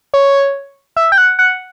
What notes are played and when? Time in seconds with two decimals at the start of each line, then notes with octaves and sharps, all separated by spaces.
0.14 C#5
0.96 E5
1.12 G5
1.18 F#5
1.39 F#5